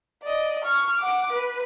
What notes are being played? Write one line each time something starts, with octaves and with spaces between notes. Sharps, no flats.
D5 D#5
C#6 F6
F#5 D6
B4